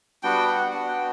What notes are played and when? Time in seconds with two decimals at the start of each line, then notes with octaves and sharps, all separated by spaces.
0.23 G3 B3 D4 F#4 G5
0.48 F#5
0.72 B3 D4 F#4 F#5
0.88 G5